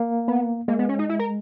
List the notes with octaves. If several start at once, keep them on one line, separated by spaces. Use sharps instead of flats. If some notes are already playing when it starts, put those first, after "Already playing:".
Already playing: A#3
B3
G#3 A#3
B3
C#4
D#4
E4
A#4